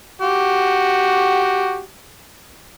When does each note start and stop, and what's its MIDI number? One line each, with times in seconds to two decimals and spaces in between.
0.22 1.82 66
0.22 1.82 67